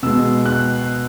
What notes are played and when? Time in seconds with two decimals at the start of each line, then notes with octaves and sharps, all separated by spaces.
0.03 B2 G#3 E6
0.45 F#6